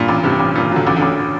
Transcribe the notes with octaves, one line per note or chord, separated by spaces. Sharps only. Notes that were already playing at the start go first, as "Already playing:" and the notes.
Already playing: G2 A#2
A1
G2 C3
A1
G2 A#2
D3 F#3
A1
A1 D3